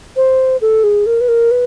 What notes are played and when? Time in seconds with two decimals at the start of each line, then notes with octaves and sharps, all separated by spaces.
0.16 C5
0.61 A4
0.83 G#4
1.06 A#4
1.21 B4
1.28 A#4
1.51 B4